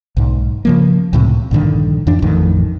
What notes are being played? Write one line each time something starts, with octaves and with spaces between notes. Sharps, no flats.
B1 G#2
C#3 F3 A#3
C#2 A2 C3
A#1 G2 D3 D#3
F2 E3 D4
A1 F2 A2 D#3